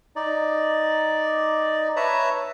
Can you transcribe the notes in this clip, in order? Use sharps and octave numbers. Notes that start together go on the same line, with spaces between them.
D#4 D5
B4 C#5 E5 A5 A#5